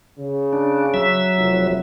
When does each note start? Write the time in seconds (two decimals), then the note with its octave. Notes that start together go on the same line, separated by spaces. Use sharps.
0.18 C#3
0.53 D4
0.94 F#3 E5
1.37 F1